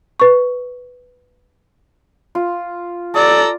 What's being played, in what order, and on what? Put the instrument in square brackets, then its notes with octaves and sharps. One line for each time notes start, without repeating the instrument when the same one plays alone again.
[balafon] B4 C#6
[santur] F4
[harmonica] A4 A#5 E6 [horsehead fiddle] D5